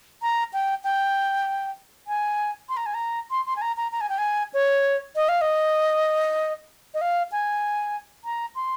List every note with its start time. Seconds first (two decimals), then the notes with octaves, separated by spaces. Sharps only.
0.22 A#5
0.53 G5
0.84 G5
2.07 G#5
2.69 C6
2.77 A#5
2.86 G#5
2.94 A#5
3.31 C6
3.46 C6
3.56 G#5
3.62 A#5
3.77 A#5
3.92 A#5
4.01 G#5
4.09 G5
4.18 G#5
4.54 C#5
5.16 D#5
5.29 F5
5.41 D#5
6.94 D#5
7.01 F5
7.32 G#5
8.24 A#5
8.55 C6